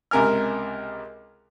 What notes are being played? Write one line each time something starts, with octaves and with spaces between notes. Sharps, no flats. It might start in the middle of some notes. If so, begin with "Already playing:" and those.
C#2 C3 A#4 G#5 F6